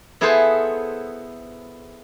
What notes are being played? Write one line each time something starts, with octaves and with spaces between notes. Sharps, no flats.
B3 E4 G#4 A4 B4 C5